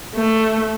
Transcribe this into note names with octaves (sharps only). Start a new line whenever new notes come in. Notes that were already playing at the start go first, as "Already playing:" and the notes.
A3